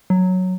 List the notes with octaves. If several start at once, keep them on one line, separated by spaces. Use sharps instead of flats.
F#3